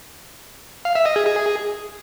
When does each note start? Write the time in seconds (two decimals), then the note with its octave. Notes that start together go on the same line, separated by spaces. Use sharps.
0.85 F5
0.95 E5
1.06 D#5
1.16 G#4
1.26 G#4